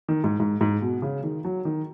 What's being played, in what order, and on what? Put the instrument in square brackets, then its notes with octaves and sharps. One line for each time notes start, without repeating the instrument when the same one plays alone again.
[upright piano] D#3
G#2
G#2
G#2
B2
C#3
D#3
F#3
D#3